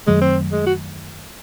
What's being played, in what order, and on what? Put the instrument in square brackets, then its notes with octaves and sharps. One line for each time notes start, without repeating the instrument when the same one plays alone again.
[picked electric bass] F#2 D#3 F#3 A3 [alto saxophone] G#3
[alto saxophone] C4
G#3
F#4